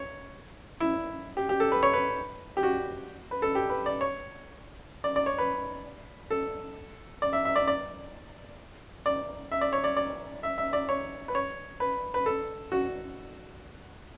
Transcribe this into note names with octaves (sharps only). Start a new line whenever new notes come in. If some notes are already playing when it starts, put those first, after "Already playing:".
Already playing: C#5
E4
G4
G4
A4
B4
C#5
B4
G4
F#4
B4
A4
G4
B4
D5
C#5
D5
D5
C#5
B4
A4
D5
E5
E5
D5
D5
D5
E5
D5
C#5
D5
D5
E5
E5
D5
C#5
B4
C#5
B4
B4
A4
F#4